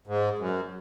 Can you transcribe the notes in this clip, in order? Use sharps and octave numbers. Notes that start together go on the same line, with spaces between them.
G#2
F#2